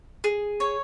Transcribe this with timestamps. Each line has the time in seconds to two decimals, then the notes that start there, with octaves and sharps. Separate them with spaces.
0.24 G#4
0.60 C#5